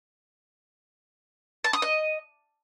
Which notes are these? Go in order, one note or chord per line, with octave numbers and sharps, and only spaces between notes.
A5
D#6
D#5